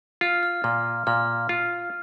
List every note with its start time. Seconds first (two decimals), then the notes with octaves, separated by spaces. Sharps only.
0.21 F4 F6
0.43 F6
0.64 A#2 F6
1.07 A#2 F6
1.49 F4